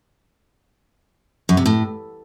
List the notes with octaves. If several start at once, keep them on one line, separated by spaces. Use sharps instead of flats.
F#2
C3
A2